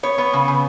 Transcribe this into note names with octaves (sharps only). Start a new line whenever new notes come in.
B3 C#5
B3
C#3
C#3